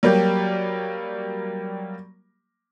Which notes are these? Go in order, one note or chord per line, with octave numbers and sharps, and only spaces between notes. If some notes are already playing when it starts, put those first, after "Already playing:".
F#3 G3 A#3 G4